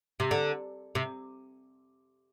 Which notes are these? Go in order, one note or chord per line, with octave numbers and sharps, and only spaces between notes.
C3
D3
C3